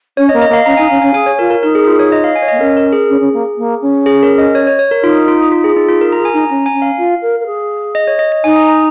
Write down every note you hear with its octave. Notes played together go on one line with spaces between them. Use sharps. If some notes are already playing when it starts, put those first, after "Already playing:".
C#4 C#5
D#5
A#3
D#5
A#3 F5
C#4 A#5
D#4 G#5
C#4 F5
C#4 G#5
G#4 G#5
C#5
F4 A#4
A#4
D#4 A#4
G#4
F4
C#5
D#5
F5
G#5
C#5
A#3 D#5
C#4 A#4
A#4
G#4
C#4
C#4
A#3
A#3
C#4
G#4
A#4
D#5
C#5
C#5
C#5
A#4
D#4 F4
F4
F4
G#4
D#4
F4
G#4 A#4
G#4 A#5
G#5
D#4 A#5
C#4 A#5
G#5
C#4
F5
F4
A#4
A#4
G#4
D#5
C#5
D#5
D#5
D#4 G#5
A#5
A#5